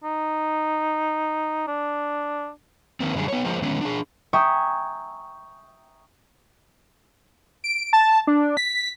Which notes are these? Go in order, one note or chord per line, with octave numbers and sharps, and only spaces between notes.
D#4
D4
D#3 A#3 C4
F#2 D3 G3 G#4
B3 C#5
F3 G#3 A#3 C5
D3 D#3 F#3 G#3 B3 C#4
D4 G#4
E5 G5 G#5 A#5 C#6 D#6
D7
A5
D4
B6